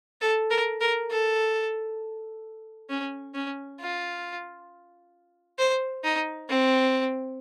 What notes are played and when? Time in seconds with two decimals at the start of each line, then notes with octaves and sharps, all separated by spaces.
0.21 A4
0.50 A#4
0.80 A#4
1.11 A4
2.90 C#4
3.35 C#4
3.80 F4
5.59 C5
6.04 D#4
6.49 C4